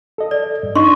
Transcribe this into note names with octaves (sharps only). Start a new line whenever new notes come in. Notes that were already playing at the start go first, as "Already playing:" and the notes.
A4 D#5
D5
G2
D4 D#4 D#5 C6 C#6